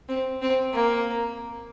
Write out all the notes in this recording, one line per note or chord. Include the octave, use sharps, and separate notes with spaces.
C4
C4
A#3